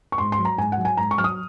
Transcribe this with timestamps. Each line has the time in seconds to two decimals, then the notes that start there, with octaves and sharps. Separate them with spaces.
0.12 C#6
0.18 G#2 C6
0.32 C6
0.38 F#3
0.45 A#5
0.58 G#2 G#5
0.72 F#5
0.78 F#3
0.85 G#5
0.97 G#2 A#5
1.11 C#6
1.18 F#3 F6
1.24 D#6